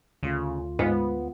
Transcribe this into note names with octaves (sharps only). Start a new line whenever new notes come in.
D2 C#3 A3 F4
G#2 F3 G#3 B3